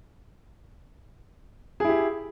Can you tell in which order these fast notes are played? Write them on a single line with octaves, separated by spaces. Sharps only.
G#4 E4 G4